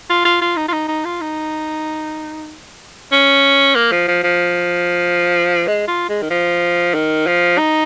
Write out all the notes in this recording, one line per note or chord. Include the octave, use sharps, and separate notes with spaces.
F4
F4
F4
D#4
F4
D#4
D#4
F4
D#4
C#4
A#3
F3
F3
F3
G#3
F4
G#3
D#3
F3
D#3
F3
D#4